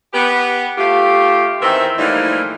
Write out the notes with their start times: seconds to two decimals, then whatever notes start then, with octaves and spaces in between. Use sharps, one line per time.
0.13 B3 G4 B4
0.78 A3 F4 G4
1.61 E2 D#3 E3 C4 E5
1.98 A2 E3 F3 G3 A#3 D#4